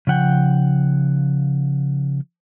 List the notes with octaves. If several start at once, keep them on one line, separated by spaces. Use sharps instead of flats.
C#3 F3 F#5 G5